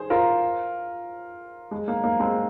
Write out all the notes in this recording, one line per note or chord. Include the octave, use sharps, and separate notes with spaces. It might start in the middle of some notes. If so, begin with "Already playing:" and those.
Already playing: G#4 C5
F4 A#4
G#3
A#3
A#3
G#3 C4